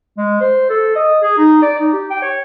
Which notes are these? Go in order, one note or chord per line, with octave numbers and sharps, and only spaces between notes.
G#3
C5
A4
D#5
G#4
D#4
D5
D#4
G4
G5
C#5